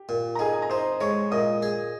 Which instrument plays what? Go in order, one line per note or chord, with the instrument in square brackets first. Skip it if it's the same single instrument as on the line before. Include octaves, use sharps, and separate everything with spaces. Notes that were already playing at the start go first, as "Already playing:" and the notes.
Already playing: [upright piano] G4
[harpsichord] A#2
[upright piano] A#5
[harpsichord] D#4 [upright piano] G#4 G#5
[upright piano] G#5
A#5
[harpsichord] D#4 [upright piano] C5 C6
[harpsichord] G#3 [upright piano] C#5 C#6
[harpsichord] A#2 [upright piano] D#5 D#6
[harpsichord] G#4